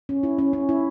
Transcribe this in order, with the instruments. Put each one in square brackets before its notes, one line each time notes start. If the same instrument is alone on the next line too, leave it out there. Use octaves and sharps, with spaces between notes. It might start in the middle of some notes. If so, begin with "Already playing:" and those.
[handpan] C#4
E4
C#4
C#4
E4